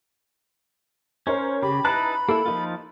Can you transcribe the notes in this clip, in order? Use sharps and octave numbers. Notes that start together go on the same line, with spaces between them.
C#4 A#4 C5 C#5
C#3 G4 B5
D#4 E4 B4 A5 A#5 F#6
A#3 E4 A4
F3 A#3 D#4 F4